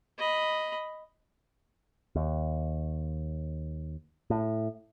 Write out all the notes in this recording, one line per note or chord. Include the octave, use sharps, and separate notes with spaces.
D#5 B5
D#2
A2